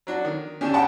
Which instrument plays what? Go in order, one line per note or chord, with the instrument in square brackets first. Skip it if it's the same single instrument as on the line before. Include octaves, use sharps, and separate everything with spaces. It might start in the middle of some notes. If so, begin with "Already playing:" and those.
[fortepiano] F#3 D4 F#4
D#3
[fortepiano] D3 D4 G4 [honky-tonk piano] C#4 E7
[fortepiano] C#3 C#4 [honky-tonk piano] F#5 G5 A5